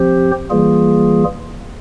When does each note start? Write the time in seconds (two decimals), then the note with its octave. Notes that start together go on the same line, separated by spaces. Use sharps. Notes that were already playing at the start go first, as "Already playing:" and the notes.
Already playing: F3 C4 G4 C5
0.50 E3 G3 A#3 F4 G#4